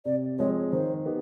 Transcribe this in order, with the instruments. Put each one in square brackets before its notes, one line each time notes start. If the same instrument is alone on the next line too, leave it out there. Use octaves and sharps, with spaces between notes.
[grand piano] C3 [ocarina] D5
[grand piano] F3 G#3 C4 [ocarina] C#5
[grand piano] D#3 [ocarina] C5
[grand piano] B3 D#4 G4